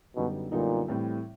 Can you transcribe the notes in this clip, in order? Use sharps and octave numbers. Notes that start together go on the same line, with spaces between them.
F#2 B2 D3 G3 B3 D#4
F#2 A#2 D3 G3 B3 D#4
A2 E3 G3 C4 E4